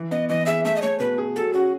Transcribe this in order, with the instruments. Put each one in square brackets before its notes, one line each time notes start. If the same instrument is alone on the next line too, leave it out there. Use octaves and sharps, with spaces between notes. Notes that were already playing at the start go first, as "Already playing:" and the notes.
Already playing: [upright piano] E3
[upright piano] B3 [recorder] D#5
[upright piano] E3 [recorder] D#5
[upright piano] G#4 [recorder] E5
[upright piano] A3 [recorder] E5
[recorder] D#5
[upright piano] A3 [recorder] C#5
[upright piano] B2 [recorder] B4
[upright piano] G#4
[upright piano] F#3 [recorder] A4
[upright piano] C#4 [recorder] F#4